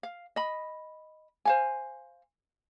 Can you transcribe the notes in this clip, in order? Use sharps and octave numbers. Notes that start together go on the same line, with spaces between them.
F5
D#5 B5
C5 F5 G#5